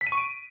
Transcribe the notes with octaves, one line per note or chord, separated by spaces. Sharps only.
B6
D#7
C#6
D7